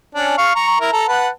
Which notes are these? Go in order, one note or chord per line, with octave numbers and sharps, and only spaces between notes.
C#4 D4
F5 C#6
A#5 C#6
E4 A#4
A4 A#5
B4 F#5 A5